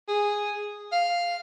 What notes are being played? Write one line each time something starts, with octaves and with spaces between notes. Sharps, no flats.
G#4
F5